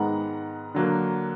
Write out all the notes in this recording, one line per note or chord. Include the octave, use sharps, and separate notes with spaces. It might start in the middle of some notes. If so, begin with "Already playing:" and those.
Already playing: G#2 D#3 G#3 B3 F#5 A#5
D3 F#3 A#3